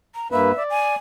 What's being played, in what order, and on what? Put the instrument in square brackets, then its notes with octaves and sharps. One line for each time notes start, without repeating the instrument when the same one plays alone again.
[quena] A#5
[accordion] G2 A#3 B4 [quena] E5
[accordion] D5
[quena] G#5